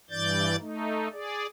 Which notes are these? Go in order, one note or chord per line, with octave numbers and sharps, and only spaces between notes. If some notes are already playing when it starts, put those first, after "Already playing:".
G2 E3 D5 G6 A6
A3 D#4
G#4 D5